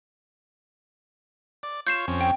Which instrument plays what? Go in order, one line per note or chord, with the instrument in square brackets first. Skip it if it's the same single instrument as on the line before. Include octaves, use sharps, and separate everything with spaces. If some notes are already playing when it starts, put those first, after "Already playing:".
[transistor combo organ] D5
[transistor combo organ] F4 C#5 [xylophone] G6 C7 E7
[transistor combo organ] F2 C4 C#4
[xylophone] G5